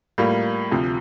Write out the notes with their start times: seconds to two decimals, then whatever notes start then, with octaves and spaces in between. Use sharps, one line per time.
0.18 A2 G3 A#3 F4
0.71 D2 C3 F3